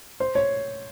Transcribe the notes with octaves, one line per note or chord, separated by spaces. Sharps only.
C5
C#5